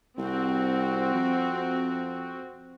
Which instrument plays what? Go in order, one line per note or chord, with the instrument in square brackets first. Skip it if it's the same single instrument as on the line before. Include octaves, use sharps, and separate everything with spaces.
[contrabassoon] C2 [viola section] C4 F#4
[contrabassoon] F2